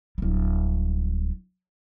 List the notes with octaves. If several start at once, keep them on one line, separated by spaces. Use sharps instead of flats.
D1 G3